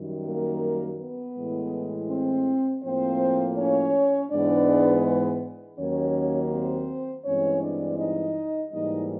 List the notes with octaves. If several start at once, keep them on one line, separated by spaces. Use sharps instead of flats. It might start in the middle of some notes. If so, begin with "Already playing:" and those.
Already playing: F#2 D#3 G3
A#3 A#4
B3 B4
A2 E3 G#3
C4 C5
A2 F3 A#3 C4 C5
C#4 C#5
G#2 E3 G#3 B3 D4 D5
D#2 D#3 F#3 A#3 C#4 C#5
C4 C5
G2 E3 G#3 C4 C#4 C#5
D4 D5
D#4 D#5
G#2 E3 G3 A#3 D#4 D#5